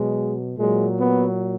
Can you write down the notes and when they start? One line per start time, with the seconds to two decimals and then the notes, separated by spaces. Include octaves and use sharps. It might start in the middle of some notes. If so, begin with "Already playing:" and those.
Already playing: B2 F#3 G#3
0.58 A#2 F#3 G#3
0.98 B3